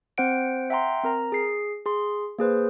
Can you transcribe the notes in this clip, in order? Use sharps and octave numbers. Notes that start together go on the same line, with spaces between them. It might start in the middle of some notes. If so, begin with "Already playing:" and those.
C4 C5 F#5 D7
E5 F#5 G5 A#5 C6
C4 A#4 A#5
G#4 C7
G#4 C6
A#3 G#4 B4 C5